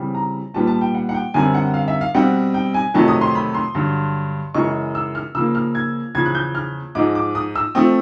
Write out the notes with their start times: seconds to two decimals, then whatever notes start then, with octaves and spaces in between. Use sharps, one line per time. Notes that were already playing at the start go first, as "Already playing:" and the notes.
Already playing: C#3 E3 G3 C4
0.15 A#5
0.54 A#2 G3 B3 A5
0.67 A5
0.81 G5
0.95 F#5
1.09 F#5
1.14 G5
1.34 F#2 D3 G3 C4 G#5
1.54 F#5
1.74 F5
1.88 E5
2.01 F5
2.14 B2 G3 C4 F#5
2.54 G5
2.74 G#5
2.94 F2 C3 D#3 F#3 A3 A5
3.08 D#6
3.21 C6
3.35 B5
3.54 C6
3.75 G2 D3 F#3
4.54 F#2 C#3 E3 G#3 C#6
4.95 E6
5.15 F6
5.35 C#3 F3 A#3 E6
5.55 F6
5.75 G#6
6.15 E2 C#3 F3 G#6
6.26 F#6
6.35 G6
6.55 F6
6.95 G#2 F3 G#3 D6
7.15 D6
7.35 D#6
7.56 E6
7.75 F3 A3 C4 D#6